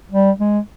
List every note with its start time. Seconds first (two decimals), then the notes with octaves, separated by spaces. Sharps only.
0.12 G3
0.40 G#3